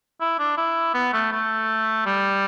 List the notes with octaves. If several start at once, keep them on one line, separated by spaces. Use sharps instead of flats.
E4
D4
E4
B3
A3
A3
G3